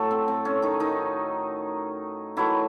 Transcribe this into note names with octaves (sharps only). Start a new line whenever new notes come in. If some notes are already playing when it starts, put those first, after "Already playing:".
Already playing: A2 F#3 A3 A4
C4
C4
C#4
D#3 D#4
D#3 D#4
D#3 E3 F#3 A3 E4